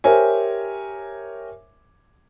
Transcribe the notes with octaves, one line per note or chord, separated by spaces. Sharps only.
G4 A#4 C5 C#5 E5 G#5